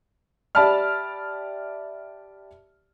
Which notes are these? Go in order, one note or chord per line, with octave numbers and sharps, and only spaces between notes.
G4 D5 E5 A5 B5 F6